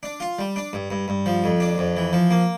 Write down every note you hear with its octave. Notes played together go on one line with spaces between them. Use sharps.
D4
F4
G3
D4
G2
G2
G2
F3
F2
D4
F2
E3
F3
A#3